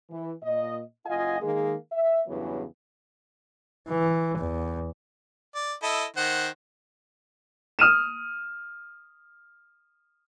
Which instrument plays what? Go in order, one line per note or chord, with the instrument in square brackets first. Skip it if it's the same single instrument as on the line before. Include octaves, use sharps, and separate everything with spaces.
[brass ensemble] E3
A#2 D#5
F#1 F4 D#5 F5 F#5 G#5
D#3 G#3 A#3 G#4
E5
E2 G2 C#3 E3 F#3 B3
[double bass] E3
E2
[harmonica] D5
E4 A4 D#5
D#3 C5 F#5
[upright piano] D#6 F6 D#7 E7